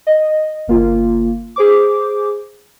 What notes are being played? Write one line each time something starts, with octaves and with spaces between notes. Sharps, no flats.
D#5
G1 A#3 F4
G#4 C5 D6